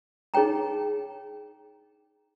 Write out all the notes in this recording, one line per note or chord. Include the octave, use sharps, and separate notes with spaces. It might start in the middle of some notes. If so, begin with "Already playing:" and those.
D#4 G#4 C#5 G5 A#5